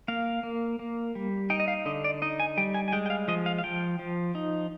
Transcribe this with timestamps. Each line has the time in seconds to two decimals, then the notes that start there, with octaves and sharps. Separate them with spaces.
0.08 A#3 F5
0.43 A#3
0.79 A#3
1.15 G3
1.50 D#4 G5
1.60 D#5
1.68 F5
1.85 D3 D#5
2.04 D5
2.22 D#4 D#5
2.40 G#5
2.57 G3 G5
2.74 G#5
2.88 G#5
2.93 G#3 G5
3.06 G5
3.10 F5
3.28 F3 D#5
3.46 F5
3.58 F5
3.64 F3 G5
3.99 F3
4.35 D#4